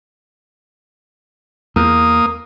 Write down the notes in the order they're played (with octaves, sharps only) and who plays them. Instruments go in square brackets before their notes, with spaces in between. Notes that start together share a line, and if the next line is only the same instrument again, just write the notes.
[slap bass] E2 [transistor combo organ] A#3 D#6